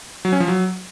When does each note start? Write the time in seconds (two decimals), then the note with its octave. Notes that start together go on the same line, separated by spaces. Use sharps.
0.25 F#3
0.32 C#4
0.40 F3
0.48 F#3